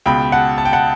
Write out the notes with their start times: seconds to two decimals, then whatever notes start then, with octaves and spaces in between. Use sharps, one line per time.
0.06 C#2 B2 G5 B5
0.32 F#5 A5
0.58 A5
0.65 G5
0.73 F#5 A5